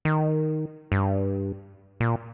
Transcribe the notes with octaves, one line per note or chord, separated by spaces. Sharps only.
D#3
G2
A#2